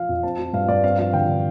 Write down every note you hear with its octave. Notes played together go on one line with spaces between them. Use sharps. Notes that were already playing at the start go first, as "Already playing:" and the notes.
Already playing: F3 F5
F2
C4 A5
F3
G2 F5
G2 D5
C4 F5
F3 F5
D3 G5
D3